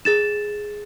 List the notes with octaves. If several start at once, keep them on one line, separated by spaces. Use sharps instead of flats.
G#4 A6 E7